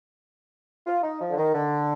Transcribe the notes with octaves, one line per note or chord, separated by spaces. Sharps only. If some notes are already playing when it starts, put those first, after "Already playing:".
F4
D#4
F3
D3
D#3
D3